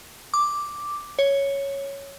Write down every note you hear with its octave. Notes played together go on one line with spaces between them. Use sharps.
D6
C#5